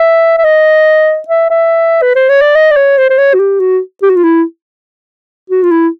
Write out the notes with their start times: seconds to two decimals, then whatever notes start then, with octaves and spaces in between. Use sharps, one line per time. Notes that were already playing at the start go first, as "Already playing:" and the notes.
Already playing: E5
0.38 E5
0.44 D#5
1.28 E5
1.50 E5
2.02 B4
2.15 C5
2.29 C#5
2.41 D5
2.55 D#5
2.71 D5
2.76 C#5
2.98 C5
3.10 C5
3.18 C#5
3.34 F#4
3.40 G4
3.60 F#4
4.02 G4
4.10 F#4
4.16 F4
4.23 E4
5.50 F#4
5.63 F4
5.71 E4